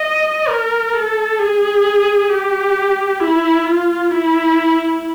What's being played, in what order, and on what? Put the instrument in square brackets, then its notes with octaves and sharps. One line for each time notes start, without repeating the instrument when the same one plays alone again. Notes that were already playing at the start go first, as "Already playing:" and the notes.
Already playing: [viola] D#5
A#4
A4
G#4
G4
E4
F4
E4